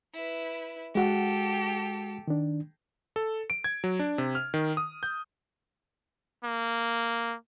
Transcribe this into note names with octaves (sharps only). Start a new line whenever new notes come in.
E4 B4
G#3 F#4 G4 A4 F#5
D#3 D4
A4
D7
G#6
F#3
D4
C3
F6
D#3
D#6
G6
A#3